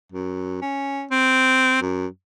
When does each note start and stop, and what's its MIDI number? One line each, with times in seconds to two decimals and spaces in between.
0.12 0.60 42
0.62 1.05 61
1.11 1.80 60
1.82 2.07 42